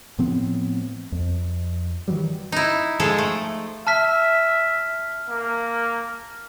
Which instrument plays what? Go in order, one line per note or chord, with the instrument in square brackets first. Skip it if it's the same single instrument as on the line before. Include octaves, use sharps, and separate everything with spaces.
[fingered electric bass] A2 F3 B3 C4
F2
D#3 E3 F#3 G3
[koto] D#4 E4
F3 G#3 G#4 A4
A3
[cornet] E5 [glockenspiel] A5 F6 B6
[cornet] A#3